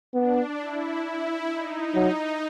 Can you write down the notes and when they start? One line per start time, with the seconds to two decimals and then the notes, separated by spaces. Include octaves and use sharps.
0.14 B3 D4
0.59 E4
1.03 E4
1.49 D#4
1.95 F#3